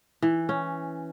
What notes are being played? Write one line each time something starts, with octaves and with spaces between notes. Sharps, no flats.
E3
C#4